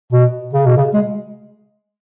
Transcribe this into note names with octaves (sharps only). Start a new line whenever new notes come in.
B2
C#3
B2
C#3
G#3